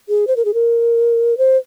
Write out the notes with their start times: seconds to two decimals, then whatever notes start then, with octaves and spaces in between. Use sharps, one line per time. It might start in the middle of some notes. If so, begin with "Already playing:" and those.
0.09 G#4
0.27 C5
0.37 A#4
0.45 G#4
0.54 A#4
1.38 C5